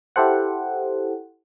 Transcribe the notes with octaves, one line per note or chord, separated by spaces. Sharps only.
E4 G4 A4 C5 F#5